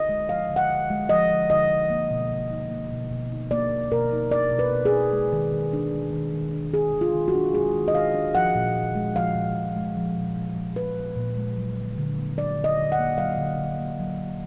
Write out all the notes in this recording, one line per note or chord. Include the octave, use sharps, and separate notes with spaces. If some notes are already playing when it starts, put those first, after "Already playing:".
Already playing: D3 D#5
G#3
F3 F5
D3
F#5
D3
G#3
F3 D#5
D3
D3 D#5
G#3
A#3
B2
B2
D#4
A#3
B2
B2
D#4
A#3 D5
B2
B2 A#4
D#4
A#3 D5
B2
B4
B2
G#4
D#4
G#3
D#3
D#3
D4
G#3
D#3
D#3
D4
G#3 G#4
D#3
F4
D#3
F#4
D4
G#3 G#4
D#3
D#5
D#3 F5
D4
F3 F#5
A#2
A#2
G#3
F3 F5
A#2
A#2
G#3
F3
A#2
A#2
G#3
F3 B4
A#2
A#2
G#3
F#3
D3
D3
A#3
F#3 D5
D3
D#5
D3
F#5
A#3
F#3 F5
D3
D3
A#3
F#3
D3